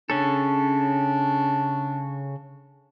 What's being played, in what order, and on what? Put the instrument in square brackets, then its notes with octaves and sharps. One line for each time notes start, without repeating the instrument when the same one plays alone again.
[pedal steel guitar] C#3 C#4 A4 [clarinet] D4